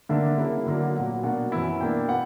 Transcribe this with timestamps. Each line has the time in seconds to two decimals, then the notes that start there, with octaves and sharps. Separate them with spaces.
0.09 D3 A#3 D4 E5
0.38 C#3 F#3 A#3 E4
0.66 D3 F#3 A#3 D4
0.95 A#2 F#3 B3
1.23 B2 A#3 D4 F#5
1.52 F#2 E3 B3 E4
1.80 B2 A#3 D4 G5
2.09 B3 E4 F#5